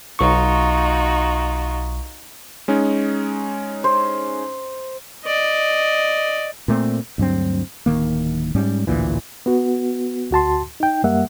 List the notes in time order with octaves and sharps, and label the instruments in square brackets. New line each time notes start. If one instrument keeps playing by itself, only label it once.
[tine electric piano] B1 C#6 [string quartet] D#4 F4 F#4
[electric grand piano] G#3 C#4 D#4
[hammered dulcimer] C5
[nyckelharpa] D5 D#5
[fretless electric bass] A#2 A3 C4
D2 G2 F#3 C4
D1 D#3 A#3
G#2 G3 C#4
A1 D2 A#2 E3
[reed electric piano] B3 F#4
D2 F#4 A5 C6
D#4 G5
F#2 G3 A#3 E5 F#5